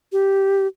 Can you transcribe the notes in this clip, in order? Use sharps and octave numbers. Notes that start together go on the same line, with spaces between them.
G4